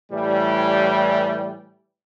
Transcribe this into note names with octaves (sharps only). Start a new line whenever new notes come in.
A2 E3 G3